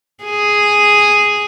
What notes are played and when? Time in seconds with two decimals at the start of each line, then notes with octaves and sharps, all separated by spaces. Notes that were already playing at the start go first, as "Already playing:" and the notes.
0.24 G#4